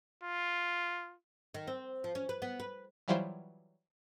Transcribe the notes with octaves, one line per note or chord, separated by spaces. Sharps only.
F4
D#3
C4
F3
C#4
B4
B3
B4
E3 F#3 G3 E4 F4 C5